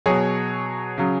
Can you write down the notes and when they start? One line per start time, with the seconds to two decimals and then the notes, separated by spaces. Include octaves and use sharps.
0.06 B2 F#3 G#4 C#5
0.98 C#3 F#3